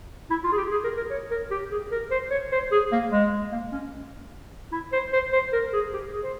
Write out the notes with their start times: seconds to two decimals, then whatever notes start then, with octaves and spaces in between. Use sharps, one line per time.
0.30 E4
0.44 F4
0.52 G#4
0.57 G4
0.71 G#4
0.84 A#4
0.97 A#4
1.11 C#5
1.31 A#4
1.51 G4
1.71 G#4
1.92 A#4
2.11 C5
2.31 C#5
2.52 C5
2.72 G#4
2.92 A#3
3.12 G#3
3.52 A#3
3.72 C#4
4.72 E4
4.93 C5
5.13 C5
5.32 C5
5.53 A#4
5.73 G#4
5.93 G4
6.13 G#4
6.23 C5